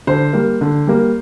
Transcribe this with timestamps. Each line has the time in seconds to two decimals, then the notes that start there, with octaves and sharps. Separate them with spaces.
0.07 D3 C5
0.33 G3 A#3
0.61 D3
0.87 G3 A#3